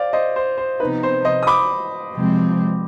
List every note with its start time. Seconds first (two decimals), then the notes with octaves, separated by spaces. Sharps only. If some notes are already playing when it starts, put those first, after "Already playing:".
Already playing: C5 D5 F5
0.13 C5 D#5
0.36 C5
0.58 C5
0.80 C3 F3 B3 D#4 B4
1.03 C5
1.25 C5 D#5
1.43 D#6
1.47 B5 D6
2.14 C3 F3 G#3 C4